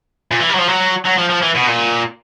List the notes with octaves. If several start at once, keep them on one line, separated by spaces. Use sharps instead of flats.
A#2
E3
G3
F#3
F3
F#3
F#3
F3
F3
E3
B2
A#2